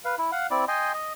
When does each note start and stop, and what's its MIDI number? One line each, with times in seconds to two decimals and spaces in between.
0.05 0.15 71
0.05 0.15 77
0.18 0.31 64
0.32 0.47 77
0.32 0.47 78
0.51 0.65 60
0.51 0.65 64
0.51 0.65 74
0.68 0.92 75
0.68 0.92 79
0.68 0.92 80
0.68 0.92 84
0.94 1.13 75